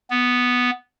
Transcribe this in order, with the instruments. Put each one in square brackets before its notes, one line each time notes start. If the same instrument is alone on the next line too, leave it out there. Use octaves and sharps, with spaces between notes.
[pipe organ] B3